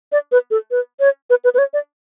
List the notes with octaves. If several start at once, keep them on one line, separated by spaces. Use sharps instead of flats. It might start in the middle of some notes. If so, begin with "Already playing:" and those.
D5
B4
A4
B4
C#5
B4
B4
B4
C#5
D5